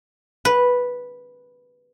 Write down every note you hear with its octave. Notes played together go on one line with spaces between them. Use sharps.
B4